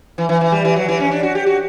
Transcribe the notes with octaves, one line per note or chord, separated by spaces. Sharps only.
E3
E3
E3
G3
E3
F#3
E3
C#4
D4
F#4
G4
F#4